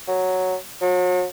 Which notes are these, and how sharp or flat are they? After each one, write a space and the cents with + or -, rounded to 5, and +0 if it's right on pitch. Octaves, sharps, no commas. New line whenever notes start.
F#3 +0
F#3 -40